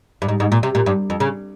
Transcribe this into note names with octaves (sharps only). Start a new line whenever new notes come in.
G2
G#2
G#2
A#2
C3
A#2
G2
F2
C#3